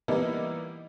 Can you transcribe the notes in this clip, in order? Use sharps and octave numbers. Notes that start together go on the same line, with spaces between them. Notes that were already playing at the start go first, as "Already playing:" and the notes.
E3 G3 A#3 B3 D#4 E4